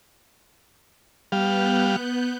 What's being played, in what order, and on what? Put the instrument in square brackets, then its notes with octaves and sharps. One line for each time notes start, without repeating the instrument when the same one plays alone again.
[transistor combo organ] G3 F5 [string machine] B3 F#6 G6